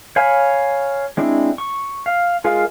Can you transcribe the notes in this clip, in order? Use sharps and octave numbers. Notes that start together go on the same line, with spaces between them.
C#5 F5 G#5 B5
G#3 C4 D4 E4
C#6
F5
G#3 F4 G#4 A#4 F5